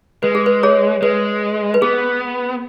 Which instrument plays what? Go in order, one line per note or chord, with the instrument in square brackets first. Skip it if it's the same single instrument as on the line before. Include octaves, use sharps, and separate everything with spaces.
[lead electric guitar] G#3 [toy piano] B4
[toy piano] G#4
B4
G#4 C#5
[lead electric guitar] G#3 [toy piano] B4
[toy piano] B4
[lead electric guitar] B3 [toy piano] G#4